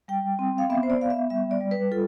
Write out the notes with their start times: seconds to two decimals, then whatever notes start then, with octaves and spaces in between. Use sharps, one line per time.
0.08 G3 G5
0.39 C4
0.58 F5
0.70 B3 E5
0.83 C5
0.90 D5
1.01 B3 F5
1.10 E5
1.30 G3 E5
1.51 D5
1.61 G3
1.71 B4
1.91 F4 A4